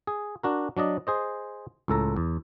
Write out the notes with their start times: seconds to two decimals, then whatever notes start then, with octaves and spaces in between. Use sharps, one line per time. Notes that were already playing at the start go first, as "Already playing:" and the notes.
0.07 G#4
0.43 D4 F#4 A#4
0.77 F#3 D4 D5 D#5
1.07 G#4 C5 D#5
1.88 C#2 A2 A4 A#5
2.16 E2